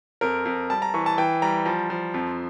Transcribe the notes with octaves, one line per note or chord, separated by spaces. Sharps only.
F2 A#4
F2
G3 A5
A#5
E3 C#6
A5
E3 G5
G3 A#5
F3 A#5
F3
F2